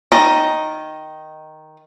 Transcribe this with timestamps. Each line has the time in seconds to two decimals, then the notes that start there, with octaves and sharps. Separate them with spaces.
0.12 D#3 D#5